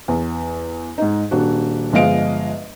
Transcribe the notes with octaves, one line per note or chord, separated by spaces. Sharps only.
E2
G#2 D#4
D#1 D4 F#4
G1 F3 G#3 D#5 F5 D7